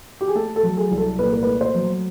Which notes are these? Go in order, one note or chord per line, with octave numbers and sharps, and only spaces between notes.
G4
G#4
A3 A4
A4
F#3
G#4
C2
A4
A#2 B4
A#4
A3 B4
C5
F#3